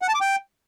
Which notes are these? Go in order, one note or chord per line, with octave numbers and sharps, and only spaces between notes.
F#5
A5
D6
G5